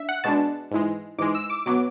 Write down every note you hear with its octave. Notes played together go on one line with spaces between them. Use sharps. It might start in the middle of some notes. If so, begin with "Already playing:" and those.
Already playing: D4 E5
F#5
B2 G#3 D4 A5
G#2 E3 G#3
G#2 E3 G#3 D6
E6
D6
B2 F#3 B3 D6